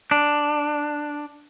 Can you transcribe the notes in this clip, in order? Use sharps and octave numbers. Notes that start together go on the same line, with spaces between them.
D4